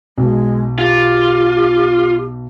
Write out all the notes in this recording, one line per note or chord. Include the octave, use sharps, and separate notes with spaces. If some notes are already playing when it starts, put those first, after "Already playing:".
B1 G#3
F4 G4